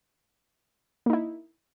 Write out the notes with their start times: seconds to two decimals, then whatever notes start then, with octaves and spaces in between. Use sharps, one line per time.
1.06 A#3
1.10 D#4
1.13 E4